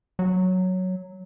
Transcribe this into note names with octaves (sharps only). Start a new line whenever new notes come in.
F#3